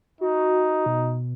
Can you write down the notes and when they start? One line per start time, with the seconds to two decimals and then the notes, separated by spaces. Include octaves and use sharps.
0.21 D#4 F#4
0.86 B2